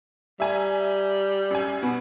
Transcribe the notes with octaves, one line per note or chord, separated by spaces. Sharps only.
G3 E5 G#5 A#5
F#2 G#5
B2 B3